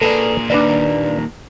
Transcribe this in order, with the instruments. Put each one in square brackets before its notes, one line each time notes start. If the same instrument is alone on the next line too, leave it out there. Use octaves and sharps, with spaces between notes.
[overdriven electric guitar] A#2 G#4 [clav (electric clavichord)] A4 B4 D5
[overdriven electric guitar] D#2 A#2 [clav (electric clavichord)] D4 B4 D5